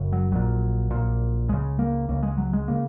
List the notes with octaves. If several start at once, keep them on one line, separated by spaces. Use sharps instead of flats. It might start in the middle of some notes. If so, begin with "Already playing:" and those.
Already playing: F#1 F#2 C#3
F#3
A#1 A#2 F#3
A#1 A#2
C#2 C#3 G#3
A#3
C#2 C#3 A#3
G#3
F#3
G#3
C#3 A#3